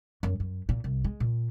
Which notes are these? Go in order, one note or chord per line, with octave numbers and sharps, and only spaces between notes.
F#2
F#2
A#2
C2
G#3
A#2